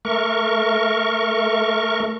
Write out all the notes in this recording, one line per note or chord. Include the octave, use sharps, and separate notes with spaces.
A3 A#4 C#6